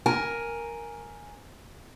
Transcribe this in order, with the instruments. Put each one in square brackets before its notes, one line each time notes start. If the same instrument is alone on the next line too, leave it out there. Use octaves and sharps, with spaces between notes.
[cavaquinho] A#4 [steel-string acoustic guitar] G#5